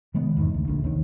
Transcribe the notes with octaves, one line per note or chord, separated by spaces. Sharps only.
C3 D#3 G#3 B3
E2 G#2 D#3
D2
A#1 A#2 D3
D#2 C3 D#3